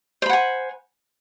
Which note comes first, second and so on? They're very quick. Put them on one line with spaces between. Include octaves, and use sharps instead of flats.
C5 B5 F#5 G#5